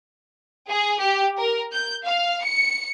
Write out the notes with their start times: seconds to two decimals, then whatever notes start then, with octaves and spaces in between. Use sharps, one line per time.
0.69 G#4
0.99 G4
1.38 A#4
1.72 G6
2.05 F5
2.44 C#7